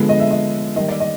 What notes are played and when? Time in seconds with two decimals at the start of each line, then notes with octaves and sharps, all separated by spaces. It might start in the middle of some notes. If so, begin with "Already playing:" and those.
Already playing: D3 F3 G#3 B3
0.09 D#5
0.20 E5
0.31 D#5
0.76 D#3 G3 A#3 D#5
0.88 D5
1.00 D#5